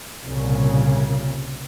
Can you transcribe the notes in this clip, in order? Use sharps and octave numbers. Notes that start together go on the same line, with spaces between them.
C2 A#2 C#3